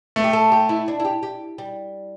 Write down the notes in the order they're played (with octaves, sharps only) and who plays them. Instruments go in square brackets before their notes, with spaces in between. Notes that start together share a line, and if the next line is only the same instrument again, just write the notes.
[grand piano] A3
[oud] G4
A4
G4
E4
D4
E4
G4
G4
G3